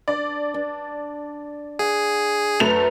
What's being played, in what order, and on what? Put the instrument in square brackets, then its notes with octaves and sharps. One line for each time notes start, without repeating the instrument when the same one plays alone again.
[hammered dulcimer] D4 [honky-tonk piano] D5
[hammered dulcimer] D4
[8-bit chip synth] G#4 [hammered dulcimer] F#5
[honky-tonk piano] F#2 A3 F7 [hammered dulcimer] B4